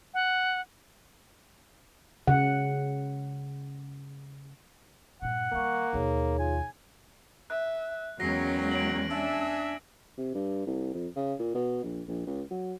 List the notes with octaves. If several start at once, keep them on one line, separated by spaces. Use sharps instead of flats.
F#5
C#3 F#5
G2 A#2 F#5
D#3 G3 A#3 F5 C#6
D#2 B2 D#4 G#4 C#5
F4 G#5
E5 F#6
E2 F#3 G#3 A#3 C#4 G5 A#6 C7
D7 F#7
D4 E5 G#5 E6
C3
G2
C2
F2
C#3
A#2
B2
A#1
A#1
C#2
F#3